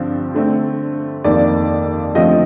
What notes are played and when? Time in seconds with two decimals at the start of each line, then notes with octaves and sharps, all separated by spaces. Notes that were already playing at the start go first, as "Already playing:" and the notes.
Already playing: G2 D3 F3 C4
0.34 D3 A3 C4
1.24 F2 D#3 A#3 D5
2.14 D3 F3 A3 C4 D#5